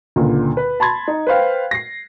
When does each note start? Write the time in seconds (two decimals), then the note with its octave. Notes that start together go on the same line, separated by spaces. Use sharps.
0.16 C#2 A#2 D3
0.57 B4
0.80 A5 B5 C6 G#6 A6
1.08 D#4
1.27 B4 C5 F5 G5
1.71 A#6 C7